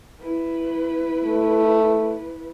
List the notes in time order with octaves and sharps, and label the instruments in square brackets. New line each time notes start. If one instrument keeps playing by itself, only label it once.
[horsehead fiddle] E4 B4
[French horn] A3